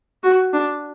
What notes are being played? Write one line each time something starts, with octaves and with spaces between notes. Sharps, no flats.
F#4
D4